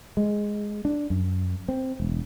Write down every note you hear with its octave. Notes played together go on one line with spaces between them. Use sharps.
G#3
D4
F#2
C4
E1